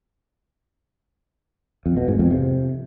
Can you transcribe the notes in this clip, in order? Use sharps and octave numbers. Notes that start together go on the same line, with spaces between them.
F2
B2
G#2
F2
C3